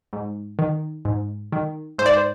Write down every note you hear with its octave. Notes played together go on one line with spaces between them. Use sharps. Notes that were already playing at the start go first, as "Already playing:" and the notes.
G#2
D#3
G#2
D#3
G#2 C5
D5
C5